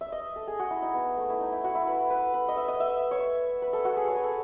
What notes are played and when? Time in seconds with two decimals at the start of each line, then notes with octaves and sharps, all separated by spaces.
0.01 E5
0.12 D#5
0.36 A4
0.48 G#4
0.59 F#4
0.71 E4
0.82 D#4
0.94 B3
1.17 A3
1.29 E4
1.41 D#4
1.52 E4
1.64 F#4
1.75 E4
1.87 B4
2.10 B4
2.34 B4
2.48 D#5
2.57 E5
2.68 D#5
2.80 E5
3.11 C#5
3.62 B4
3.73 A4
3.85 F#4
3.97 G#4
4.08 C#5
4.16 B4
4.24 A4